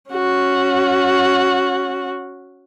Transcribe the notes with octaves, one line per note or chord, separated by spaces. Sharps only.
C#4 F#4